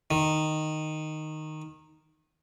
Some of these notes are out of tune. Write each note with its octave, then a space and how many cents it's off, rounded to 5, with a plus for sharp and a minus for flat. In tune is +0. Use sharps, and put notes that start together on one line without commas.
D#3 -5